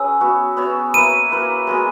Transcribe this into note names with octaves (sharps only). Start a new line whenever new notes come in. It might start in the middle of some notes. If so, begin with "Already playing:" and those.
Already playing: C#4 G#4 B4 E6
B3 F#4 C#5 E5
B3 F#4 C#5 E5
A#3 E4 B4 E5 D#7
A#3 E4 B4 E5
G#3 B3 F#4 A#4